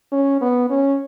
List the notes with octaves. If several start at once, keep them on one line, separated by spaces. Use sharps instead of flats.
C#4
B3
C#4